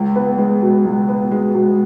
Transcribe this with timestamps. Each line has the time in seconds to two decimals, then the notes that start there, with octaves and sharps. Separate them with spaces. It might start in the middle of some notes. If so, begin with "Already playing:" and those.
Already playing: C#2
0.16 B3
0.38 G#3
0.62 B2
0.85 C#2
1.09 B3
1.31 G#3
1.54 B2